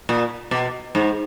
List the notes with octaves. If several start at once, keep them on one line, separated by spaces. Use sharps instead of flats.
A#2
B2
G#2